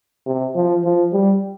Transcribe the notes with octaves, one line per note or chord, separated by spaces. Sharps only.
C3
F3
F3
G3